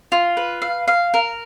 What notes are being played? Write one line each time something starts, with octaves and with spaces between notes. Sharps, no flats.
F4
B4
F5
F5
A#4